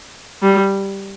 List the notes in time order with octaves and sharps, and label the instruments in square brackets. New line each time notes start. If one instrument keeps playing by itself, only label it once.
[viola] G3